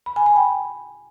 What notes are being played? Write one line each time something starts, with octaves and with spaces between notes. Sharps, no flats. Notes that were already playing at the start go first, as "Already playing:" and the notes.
B5
G#5
B5
G5